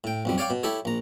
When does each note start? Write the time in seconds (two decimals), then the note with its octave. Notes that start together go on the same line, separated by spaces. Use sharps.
0.04 A2 G5
0.25 B1 F2 G3
0.38 C#5 D5 F5 G5 D6
0.50 B2
0.63 E4 G4 A4 C#5
0.85 A#1 A#5